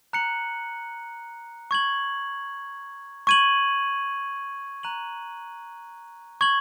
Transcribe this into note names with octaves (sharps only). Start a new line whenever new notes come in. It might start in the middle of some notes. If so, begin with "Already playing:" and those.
A#5 F#6 C#7 F#7
C#6 G#6 F#7
C#6 G#6 D#7 F#7
A#5 F#6 D#7 F#7
C#6 G#6 F#7